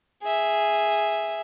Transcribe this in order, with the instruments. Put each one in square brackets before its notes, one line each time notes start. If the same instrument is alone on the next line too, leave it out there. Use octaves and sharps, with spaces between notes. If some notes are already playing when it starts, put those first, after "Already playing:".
[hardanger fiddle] G#4 E5